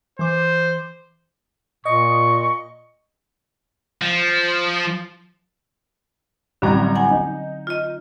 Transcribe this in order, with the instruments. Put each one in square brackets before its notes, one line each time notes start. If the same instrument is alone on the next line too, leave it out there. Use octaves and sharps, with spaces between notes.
[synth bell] E3 D6 [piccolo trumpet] C5
[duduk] A#2 [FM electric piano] D#5 [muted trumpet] C#6
[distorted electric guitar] F3
[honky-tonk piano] A1 G3 A#5 [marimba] D3 F#3 C4
[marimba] F#5 G#5
[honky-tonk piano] D#4
[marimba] F4 D#5